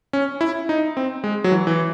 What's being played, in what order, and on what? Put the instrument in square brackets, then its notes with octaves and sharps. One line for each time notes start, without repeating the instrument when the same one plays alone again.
[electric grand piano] C#4
E4
D#4
C4
G#3
F#3
E3
E3